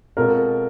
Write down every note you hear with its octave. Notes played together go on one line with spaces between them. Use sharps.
B2 G#3 C4 F4 A4 A#4